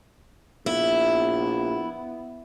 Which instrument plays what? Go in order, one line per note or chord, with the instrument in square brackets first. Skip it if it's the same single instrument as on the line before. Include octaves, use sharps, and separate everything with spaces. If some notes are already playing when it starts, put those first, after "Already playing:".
[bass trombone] A#1 [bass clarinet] B3 [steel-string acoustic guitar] E4